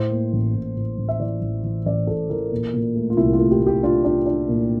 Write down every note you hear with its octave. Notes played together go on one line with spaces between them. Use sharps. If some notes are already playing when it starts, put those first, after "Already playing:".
Already playing: A2 C5
A#3
A1
A2
A2
A1
E5
E3 D5
A1
E3
A1 D5
A2 A4
E3 A#4
A#2
A#2
A3
F4
C2 E4
F4
A3
G4
A3
G4
D4 F4
D4 F4
D4
A#2